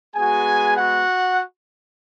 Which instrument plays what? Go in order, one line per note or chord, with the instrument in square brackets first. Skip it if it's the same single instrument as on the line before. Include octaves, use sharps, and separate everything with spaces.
[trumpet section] G#3 B3 F#4 G#4 G#5
F#4 F#5